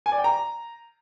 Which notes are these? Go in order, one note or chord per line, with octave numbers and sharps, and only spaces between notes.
G#5
D5
G5
A#5